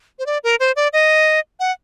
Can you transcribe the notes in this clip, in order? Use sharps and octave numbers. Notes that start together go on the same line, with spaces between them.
C5
D5
A#4
C5
D5
D#5
F#5